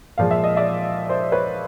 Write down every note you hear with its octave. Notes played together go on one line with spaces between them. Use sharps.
A#2 F3 G#3 F5
E5
D#5
D5 E5
C5 D5
B4 C#5